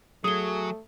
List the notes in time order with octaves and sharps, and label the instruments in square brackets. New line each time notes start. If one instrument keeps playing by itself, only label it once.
[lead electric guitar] F#3 [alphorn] A3 [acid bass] G#4 [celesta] D#6 G7